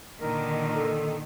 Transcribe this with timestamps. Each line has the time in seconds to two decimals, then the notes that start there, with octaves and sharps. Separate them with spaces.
0.21 A#2 D3 D#3 A#4
0.75 A4